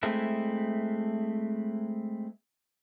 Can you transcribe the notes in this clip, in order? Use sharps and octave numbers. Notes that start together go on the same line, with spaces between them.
G#3 A3 C4 E4